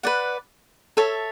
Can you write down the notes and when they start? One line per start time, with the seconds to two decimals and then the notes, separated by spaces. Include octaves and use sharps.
0.03 B4 D5 F#5
0.97 A4 C#5 E5 A5